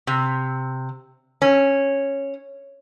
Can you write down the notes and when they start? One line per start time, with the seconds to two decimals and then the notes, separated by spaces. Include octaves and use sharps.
0.07 C3
1.42 C#4